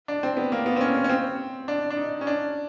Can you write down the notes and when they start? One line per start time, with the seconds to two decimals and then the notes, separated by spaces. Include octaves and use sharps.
0.08 D4
0.23 C4
0.37 B3
0.52 A#3
0.66 B3
0.76 C4
0.81 C#4
0.95 C4
1.04 C#4
1.09 C4
1.68 D4
1.90 D4
1.97 D#4
2.21 C#4
2.27 D4